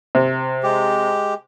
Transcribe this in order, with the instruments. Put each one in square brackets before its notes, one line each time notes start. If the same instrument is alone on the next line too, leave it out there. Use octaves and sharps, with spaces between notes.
[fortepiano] C3
[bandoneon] G#3 G4